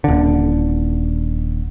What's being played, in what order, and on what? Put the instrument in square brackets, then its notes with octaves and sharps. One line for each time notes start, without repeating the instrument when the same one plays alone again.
[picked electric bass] D#1 D3